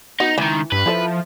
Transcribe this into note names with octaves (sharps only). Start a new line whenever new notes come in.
B3 D#4 F#4
C#2 D#3 E3
G2 B4
F3 E4 A4 E5